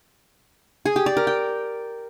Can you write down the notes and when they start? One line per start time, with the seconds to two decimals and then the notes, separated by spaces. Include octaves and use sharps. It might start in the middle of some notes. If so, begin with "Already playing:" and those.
0.85 G#4
0.96 G4
1.06 D5
1.17 A#4
1.27 G5